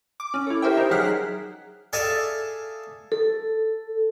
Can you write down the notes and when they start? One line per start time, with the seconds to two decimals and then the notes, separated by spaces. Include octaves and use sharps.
0.20 D6
0.34 C#4
0.47 E4 A4
0.62 G4 A#4 C5 E5 G5
0.77 D#4
0.91 F#3 G#4 F#5 F6 F#6 B6
1.93 G#4 A4 D5 E5 F5 A5
3.12 A4